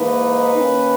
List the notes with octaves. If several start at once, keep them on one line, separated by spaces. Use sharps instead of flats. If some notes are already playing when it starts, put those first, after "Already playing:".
Already playing: G#2 E3 A#3 D#4 B4
D#3 A#3 C#4